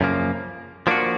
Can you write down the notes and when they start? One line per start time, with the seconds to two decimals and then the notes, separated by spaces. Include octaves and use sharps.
0.01 F#2 C#3 F3 A#3
0.87 F3 A#3 D4 F#4